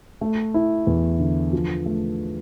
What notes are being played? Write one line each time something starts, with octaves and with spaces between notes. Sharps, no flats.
A3
E4
E2
D3
F3
A3